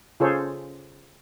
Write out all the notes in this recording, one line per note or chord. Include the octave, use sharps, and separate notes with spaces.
C#3 F4 G#4 A4 C5 C#5